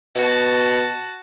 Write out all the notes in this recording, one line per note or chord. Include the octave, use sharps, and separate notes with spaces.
B2 F#4 A5